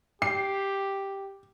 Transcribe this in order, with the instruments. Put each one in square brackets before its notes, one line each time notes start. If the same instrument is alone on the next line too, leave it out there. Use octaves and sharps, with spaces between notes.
[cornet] G4 [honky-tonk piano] C7